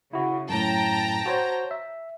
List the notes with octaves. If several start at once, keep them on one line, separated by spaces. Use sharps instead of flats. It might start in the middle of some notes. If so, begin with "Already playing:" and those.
C#3 E4 F#4
F#2 A2 G5 A5 A#5
F#4 C5 C#5
E5